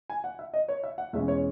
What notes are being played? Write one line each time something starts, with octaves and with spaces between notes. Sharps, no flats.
G#5
F#5
E5
D#5
C#5
E5
F#5
E2 B2 G#3 C#4 E5
C#5